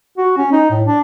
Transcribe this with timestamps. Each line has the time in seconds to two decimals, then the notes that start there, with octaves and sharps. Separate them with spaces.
0.18 F#4
0.37 C#4
0.52 D#4
0.71 A2
0.87 D4